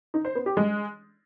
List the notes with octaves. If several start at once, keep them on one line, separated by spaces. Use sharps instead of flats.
D#4
C5
B3
G4
G#3